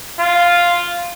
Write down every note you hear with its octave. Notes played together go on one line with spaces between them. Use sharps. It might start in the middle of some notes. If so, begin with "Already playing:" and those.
F4